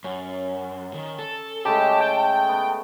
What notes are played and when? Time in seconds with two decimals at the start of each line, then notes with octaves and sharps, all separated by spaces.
0.04 F#2 C#4
0.94 D#3
1.19 A4
1.65 C#3 G#3 A3 G4 A5
2.01 G5
2.49 B3